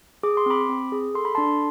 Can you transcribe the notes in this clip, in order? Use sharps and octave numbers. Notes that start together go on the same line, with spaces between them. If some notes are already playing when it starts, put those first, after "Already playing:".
G#4 D6
C6
C4 B5 D6
C4
G#4
A4 C6
B5
D4 A5 C6